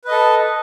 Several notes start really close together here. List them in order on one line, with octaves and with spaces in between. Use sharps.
B4 D#5 A4